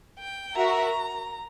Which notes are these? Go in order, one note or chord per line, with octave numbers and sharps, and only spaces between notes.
G5
F#4 A#4 E5 A#5